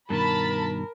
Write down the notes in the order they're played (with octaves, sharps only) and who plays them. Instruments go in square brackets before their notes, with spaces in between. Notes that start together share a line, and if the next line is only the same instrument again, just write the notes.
[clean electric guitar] G2 B2 D#3 [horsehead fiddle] A#4 [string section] A5 B5 A6